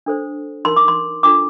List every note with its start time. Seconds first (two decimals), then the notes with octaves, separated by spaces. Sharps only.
0.06 D4 A4 C5
0.65 D#4 A#4 C6
0.77 D6
0.88 C6
1.23 D4 F4 A4 D6